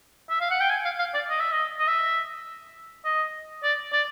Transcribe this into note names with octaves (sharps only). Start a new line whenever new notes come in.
E5
F5
F#5
G5
G#5
F5
F5
D5
D#5
E5
D#5
D#5
E5
D#5
D5
D5